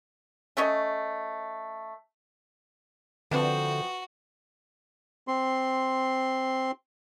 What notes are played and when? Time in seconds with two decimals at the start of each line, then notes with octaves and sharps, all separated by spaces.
0.57 A3 C#4 C#5 D#5
3.31 D3 F3 C4 F#4 B4 E5
5.28 C4 C6